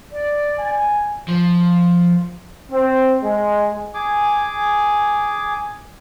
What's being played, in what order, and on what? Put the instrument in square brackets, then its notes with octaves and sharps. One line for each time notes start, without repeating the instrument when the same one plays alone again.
[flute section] D5
[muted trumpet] G#5
[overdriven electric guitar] F3
[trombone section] C4
G#3
[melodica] G#4 G#5 D6